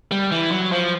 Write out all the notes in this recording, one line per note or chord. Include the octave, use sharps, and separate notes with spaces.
G3
E3
F#3
F3